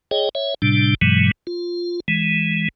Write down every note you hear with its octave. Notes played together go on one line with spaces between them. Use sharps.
G#4 C#5 D#5 G5
C#5 E5
A2 C3 G3 D4
G2 B2 E3 F#3 G#3
F4
E3 G#3